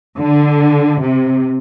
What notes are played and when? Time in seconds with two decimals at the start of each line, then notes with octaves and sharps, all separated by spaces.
0.17 D3
1.01 C3